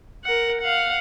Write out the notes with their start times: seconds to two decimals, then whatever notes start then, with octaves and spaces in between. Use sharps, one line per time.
0.24 A#4 F#5
0.61 F5 F#5